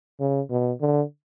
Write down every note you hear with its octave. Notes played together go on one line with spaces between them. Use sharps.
C#3
B2
D3